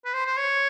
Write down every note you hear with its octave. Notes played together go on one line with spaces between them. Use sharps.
B4
C5
C5
C#5